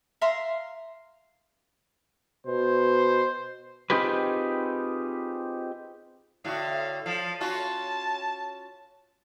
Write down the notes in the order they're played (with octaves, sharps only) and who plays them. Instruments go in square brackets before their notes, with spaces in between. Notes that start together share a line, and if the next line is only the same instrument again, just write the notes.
[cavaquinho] E5 F5 A#5 C6
[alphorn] B2 [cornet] C5
[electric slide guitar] C4 D#4 F4 G4 G#4 B4
[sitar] A2 D3 F#4 [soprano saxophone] F5
[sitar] F3 [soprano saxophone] F5
[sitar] C#4 F4 F#4 [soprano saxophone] A5